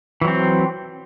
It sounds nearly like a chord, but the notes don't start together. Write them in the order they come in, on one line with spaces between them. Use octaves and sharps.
E3 F#3 C4